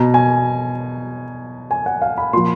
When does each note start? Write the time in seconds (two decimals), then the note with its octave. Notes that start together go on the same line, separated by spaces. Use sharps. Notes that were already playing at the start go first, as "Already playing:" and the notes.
Already playing: B2 A#5
0.14 G#5
1.71 G#5
1.86 F#5
2.02 F5
2.18 B5
2.33 A#2 F3 C6